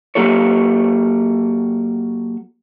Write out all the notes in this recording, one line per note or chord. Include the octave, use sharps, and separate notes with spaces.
F#3 A#3 G4 A4 C#5